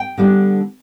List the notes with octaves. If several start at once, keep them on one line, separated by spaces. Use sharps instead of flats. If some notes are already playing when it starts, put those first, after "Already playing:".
Already playing: G5
D3 G3 B3 D4